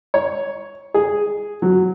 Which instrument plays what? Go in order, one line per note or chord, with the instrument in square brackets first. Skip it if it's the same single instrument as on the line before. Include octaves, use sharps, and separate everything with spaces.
[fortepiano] C#5
G#4
F#3